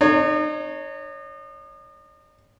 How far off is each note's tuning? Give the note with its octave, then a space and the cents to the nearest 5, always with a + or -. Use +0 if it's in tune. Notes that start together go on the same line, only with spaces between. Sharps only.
D#4 -40 C#5 +0